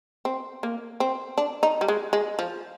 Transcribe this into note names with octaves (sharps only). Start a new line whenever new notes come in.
C4
A#3
C4
D4
D#4
G3
G#3
G#3
F3